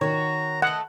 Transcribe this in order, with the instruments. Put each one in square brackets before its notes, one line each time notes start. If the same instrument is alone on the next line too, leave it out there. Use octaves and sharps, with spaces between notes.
[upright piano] D#3 [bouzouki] F#4 C#5 [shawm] A#5
[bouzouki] A3 A4 [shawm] D#5 [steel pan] F#5